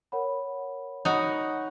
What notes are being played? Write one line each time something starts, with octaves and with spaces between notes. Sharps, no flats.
A#4 C#5 F#5 B5
D#4 F#4 C#5 F#5 B5